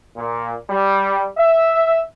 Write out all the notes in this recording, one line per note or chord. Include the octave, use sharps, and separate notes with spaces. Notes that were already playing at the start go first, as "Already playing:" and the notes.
A#2
G3
E5